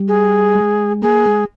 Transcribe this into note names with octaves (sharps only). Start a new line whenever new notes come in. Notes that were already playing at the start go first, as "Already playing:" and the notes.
Already playing: G3
G#4
G#3
A#3 G#4
G#3